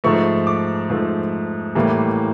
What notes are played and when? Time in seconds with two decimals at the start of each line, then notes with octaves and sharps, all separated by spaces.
0.04 G#2 F3 A3 C#6
0.47 D6
0.90 G#2 F3 A3
1.75 A2 E3 G3 A#3